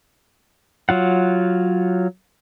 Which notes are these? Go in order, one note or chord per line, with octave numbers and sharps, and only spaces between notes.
F#3 F4 F#5